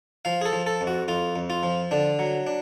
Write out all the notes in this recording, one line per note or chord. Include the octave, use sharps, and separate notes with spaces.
F3 F5
G#4
A4
F3
A4
F2
F#4
F2 F4
F2
F4
F3
D3 D4
F#3
D4